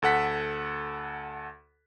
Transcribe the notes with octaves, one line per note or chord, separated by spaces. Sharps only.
D2 A4 F#5 B6